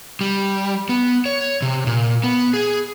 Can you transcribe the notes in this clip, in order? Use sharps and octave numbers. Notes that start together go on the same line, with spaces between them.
G3
B3
C#5
C3
A#2
B3
G#4